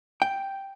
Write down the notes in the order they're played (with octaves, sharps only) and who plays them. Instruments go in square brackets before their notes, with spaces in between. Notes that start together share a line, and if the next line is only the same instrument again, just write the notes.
[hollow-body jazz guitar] G5